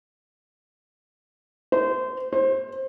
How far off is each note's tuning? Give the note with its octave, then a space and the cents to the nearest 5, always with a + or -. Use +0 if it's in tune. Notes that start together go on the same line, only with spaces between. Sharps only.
C5 -25
C5 +20